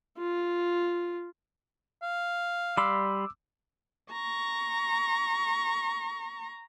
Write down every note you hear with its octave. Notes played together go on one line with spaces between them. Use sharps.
F4
F5
G3 B5 C6 D6 E6
A#5 C#6